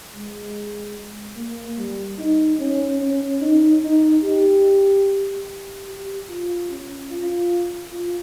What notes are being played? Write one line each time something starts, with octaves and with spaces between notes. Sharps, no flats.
G#3
A#3
G3
D#4
C#4
C#4
D#4
D#4
G4
G4
F4
C#4
F4
F4